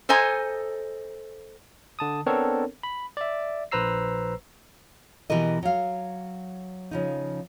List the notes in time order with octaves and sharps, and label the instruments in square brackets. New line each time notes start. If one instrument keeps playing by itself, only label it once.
[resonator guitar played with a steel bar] A4 C5 D#5 G#5 A#5
[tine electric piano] D3 A5 D#6
B3 C4 D4 A4 A#4 C#5
B5
D5 E5
A#1 B4 C5 A#5 E6 C7
[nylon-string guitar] B2 E3 G4 A#4 D#5
F#3 F5
C#3 F3 D#4